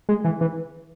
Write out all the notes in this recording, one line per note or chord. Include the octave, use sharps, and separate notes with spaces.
G#3
E3
E3